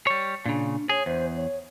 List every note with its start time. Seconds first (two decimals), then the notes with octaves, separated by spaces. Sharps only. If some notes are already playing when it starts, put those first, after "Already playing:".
0.07 G3 C#5
0.46 A#2 C#3 D4
0.89 G#4 C#5
1.06 E2 C5
1.36 C#5